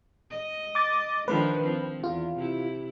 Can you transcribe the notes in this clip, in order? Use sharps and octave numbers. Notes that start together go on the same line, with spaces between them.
D#5
D6 A6
D#3 F3 D4 B4
F3 C4
E2 F4
C3 E4